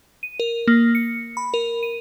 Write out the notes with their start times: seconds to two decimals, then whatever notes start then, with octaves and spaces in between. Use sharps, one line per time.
0.23 D#7
0.40 A#4
0.67 A#3
0.95 C#7
1.37 B5
1.54 A#4
1.83 D#7